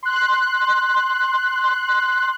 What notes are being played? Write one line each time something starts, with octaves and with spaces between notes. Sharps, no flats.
C6 F#6